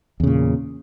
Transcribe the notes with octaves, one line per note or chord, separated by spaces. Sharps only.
E2 A#2 C#3